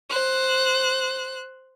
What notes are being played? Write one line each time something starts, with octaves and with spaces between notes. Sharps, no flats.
C5 F#6